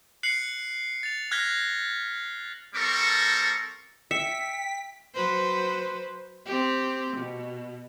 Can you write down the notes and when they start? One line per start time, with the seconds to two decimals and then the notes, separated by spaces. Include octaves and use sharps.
0.23 F#6 C7 C#7 F#7
1.03 A6 F7
1.31 F6 F#6 G#6 A#6 B6 G7
2.74 G3 C4 A4 A#4 C#6
4.11 E5 G5 B6 C#7
5.14 F#3 B4 C5
6.46 C4 G4
7.16 B2